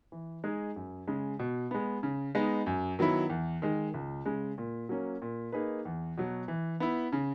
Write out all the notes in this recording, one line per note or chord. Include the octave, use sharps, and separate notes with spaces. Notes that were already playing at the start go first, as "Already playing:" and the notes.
E3
G#3 D#4 G#4
F#2
C#3 G#3
B2
G#3 B3
C#3
G#3 B3 D#4
F#2
D#3 F#3 B3 E4
E2
D#3 G#3
C#2
C#3 G#3
A#2
F#3 A#3 C#4
A#2
A#3 D#4 G#4 B4
E2
B2 F#3
E3
B3 E4
C#3